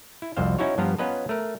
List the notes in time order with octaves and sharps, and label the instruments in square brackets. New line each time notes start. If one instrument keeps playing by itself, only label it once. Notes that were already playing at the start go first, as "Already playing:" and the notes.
[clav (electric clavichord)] E4
C2 F2 F#4 C5 F5
C#4 D#4 E4 F#4 C#5
G2 F3 B3 F4 A#5
B3 C#4 F4 B4 D#5 A#5
A3 A#4